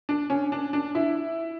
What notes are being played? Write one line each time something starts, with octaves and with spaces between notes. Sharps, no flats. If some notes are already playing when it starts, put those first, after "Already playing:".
D4
C#4
D4
D4
E4